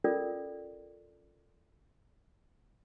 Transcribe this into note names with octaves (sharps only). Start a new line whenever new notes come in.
C#4 F4 A4 A#4 D5